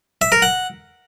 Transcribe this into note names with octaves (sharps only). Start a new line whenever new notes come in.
E5
A#4
F#5